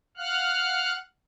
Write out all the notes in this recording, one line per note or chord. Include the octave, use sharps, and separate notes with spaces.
F5 F#5 F6 F#6